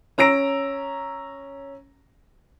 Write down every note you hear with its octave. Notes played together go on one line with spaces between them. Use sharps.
C#4 A#5 E6 A#6 D7